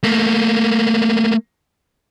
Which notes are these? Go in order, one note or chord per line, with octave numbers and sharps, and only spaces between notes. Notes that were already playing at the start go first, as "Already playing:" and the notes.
A3 A#3